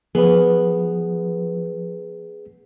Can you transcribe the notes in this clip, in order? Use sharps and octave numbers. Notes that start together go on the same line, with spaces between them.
F3 B3 G#4 B4